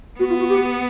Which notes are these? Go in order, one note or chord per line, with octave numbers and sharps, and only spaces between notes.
B3 F#4
F4
F#4
G4